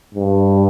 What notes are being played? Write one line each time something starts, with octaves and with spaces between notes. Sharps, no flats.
G2